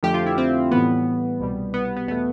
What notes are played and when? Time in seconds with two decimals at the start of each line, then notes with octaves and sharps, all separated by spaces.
0.03 F2 D3 F3 A3 G4
0.14 F4
0.26 E4
0.38 C4
0.71 A2 E3 G3 B3
1.40 C2 B2 G3
1.74 B3
1.85 B3
1.97 B3
2.07 E2 B2 A3 B3